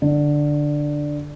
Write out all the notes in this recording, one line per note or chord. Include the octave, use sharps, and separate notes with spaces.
D3